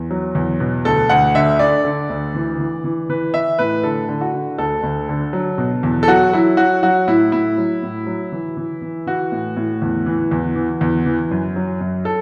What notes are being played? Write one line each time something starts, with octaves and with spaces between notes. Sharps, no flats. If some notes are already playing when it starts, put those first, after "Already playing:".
Already playing: E2
F#3
E2
B2
D2 A4
D2 F#5
D3 E5
D3 D5
D3
D2
E3
E3
E3
E3 B4
E3 E5
A2 B4
D3 A4
D3
F#4
D3
D2 A4
D2
D3
F#3
B2
E2
A4
F#3 F#4
F#3 E4
F#3 F#4
F#3 F#4
A2 E4
A2 E4
F#3
A2
F#3
E3
E3
E3
E3 F#4
A2
A2
E2
E3
E2
E3
E2
E3
F#2
F#3
F#2
A4